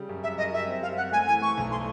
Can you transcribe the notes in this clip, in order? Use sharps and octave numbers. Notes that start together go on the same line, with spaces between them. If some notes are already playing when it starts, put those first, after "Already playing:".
Already playing: C#3 G3
F#2
F#2 E5
F#2 D#5
G3 E5
C4
G3 F5
C4 F#5
A3 G#5
E3 G#5
A3 C#6
B1
C6